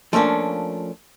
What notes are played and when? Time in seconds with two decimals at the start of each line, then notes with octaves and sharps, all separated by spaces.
0.13 F3 A3 A#3 C#4 D4